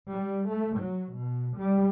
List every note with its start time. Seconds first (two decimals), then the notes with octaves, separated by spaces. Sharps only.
0.12 G3
0.48 A3
0.78 F#3
1.16 B2
1.57 G3